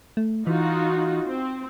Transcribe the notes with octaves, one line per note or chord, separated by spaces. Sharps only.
A3
E3 D#4 F4 F#4
C4